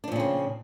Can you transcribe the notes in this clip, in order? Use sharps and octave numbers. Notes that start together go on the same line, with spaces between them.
A#2 C#3 F3 C4 D4